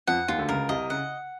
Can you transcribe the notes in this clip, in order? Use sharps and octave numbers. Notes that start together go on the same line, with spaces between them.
F2 F3 F#5
D#2 D#3 F4
D2 D3
C#2 C#3 A#4
C2 C3 D#5
C#3 F#5